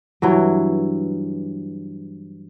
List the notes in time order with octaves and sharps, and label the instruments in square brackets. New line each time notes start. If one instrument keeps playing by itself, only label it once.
[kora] G2 E3 F#3